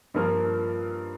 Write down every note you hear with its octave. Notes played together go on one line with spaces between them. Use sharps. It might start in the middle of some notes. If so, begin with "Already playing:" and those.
G2 F3 A#3 F4 A#4